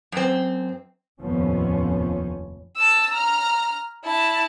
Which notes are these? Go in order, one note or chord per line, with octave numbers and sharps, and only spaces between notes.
F#2 C4
F1 D#2 A2 F3 B3 C#4
A5 E6
A#5 F6
E4 A5